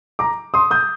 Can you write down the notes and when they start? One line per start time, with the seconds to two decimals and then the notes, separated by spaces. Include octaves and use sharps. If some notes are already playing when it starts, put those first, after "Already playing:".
0.19 A#5 D6
0.54 C6 D#6
0.71 D#6 G6